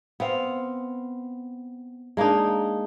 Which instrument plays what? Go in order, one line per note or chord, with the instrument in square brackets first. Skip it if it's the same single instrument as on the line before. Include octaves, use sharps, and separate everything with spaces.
[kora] B3 C4 F5
G#3 A#3 D4 D#4